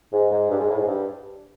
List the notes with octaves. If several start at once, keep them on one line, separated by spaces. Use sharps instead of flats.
G#2
G#2
G2
G#2
A2
G#2
G2